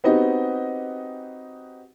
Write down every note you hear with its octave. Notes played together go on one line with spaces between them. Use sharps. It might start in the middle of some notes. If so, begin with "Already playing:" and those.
B3 C4 D#4 F#4 G4 D#5